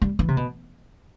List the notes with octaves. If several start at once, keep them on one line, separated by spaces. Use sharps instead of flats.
G3
E3
C3
B2